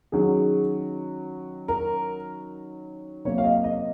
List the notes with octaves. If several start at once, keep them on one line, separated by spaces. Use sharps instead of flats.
D#3 F#3 C#4 G#4
A#4
C3 F#3 A#3 C#5
F5
D#5
D#5